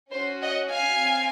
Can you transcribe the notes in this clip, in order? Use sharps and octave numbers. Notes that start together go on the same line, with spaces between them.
C#4 F#4 C5
D#5 F#5
F5 G#5
C4